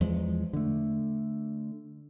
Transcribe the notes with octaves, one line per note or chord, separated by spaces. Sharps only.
E2 F3 G#3
D3 A3